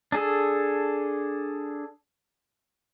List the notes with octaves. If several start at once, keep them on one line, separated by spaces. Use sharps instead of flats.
D4 G#4 A4